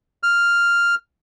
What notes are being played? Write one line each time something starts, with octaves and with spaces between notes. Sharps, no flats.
F6